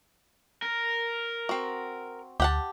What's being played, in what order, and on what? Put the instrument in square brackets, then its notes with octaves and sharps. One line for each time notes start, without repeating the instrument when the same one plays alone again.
[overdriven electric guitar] A#4
[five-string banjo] C4 F#4
[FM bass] D2 [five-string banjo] G4 F#5 A5